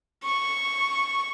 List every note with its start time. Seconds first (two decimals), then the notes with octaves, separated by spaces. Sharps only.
0.24 C#6